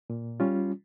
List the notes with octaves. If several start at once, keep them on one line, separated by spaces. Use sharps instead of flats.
A#2
G3 C#4 F4